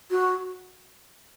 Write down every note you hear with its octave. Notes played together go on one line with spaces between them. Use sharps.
F#4